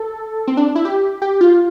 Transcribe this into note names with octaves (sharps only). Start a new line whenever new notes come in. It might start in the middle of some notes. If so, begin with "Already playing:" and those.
Already playing: A4
C4
D4
E4
G4
G4
F4